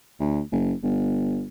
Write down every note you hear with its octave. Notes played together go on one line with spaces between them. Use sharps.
D2
F#1
G1